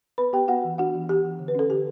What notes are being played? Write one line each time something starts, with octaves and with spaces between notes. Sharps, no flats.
B3 B4 B5
B3 G4 G5
B3 F#4 F#5
E3
D4 F#4 F#5
E3
E3 G4
E3
D3
B4
C#4 A4
D3 G4